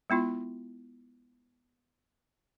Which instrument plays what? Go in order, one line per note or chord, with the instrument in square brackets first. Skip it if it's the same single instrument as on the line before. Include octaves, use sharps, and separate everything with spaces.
[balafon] G#3 B3 E4 F4